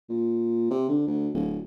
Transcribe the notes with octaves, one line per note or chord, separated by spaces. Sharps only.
A#2
C3
D3
D2
D1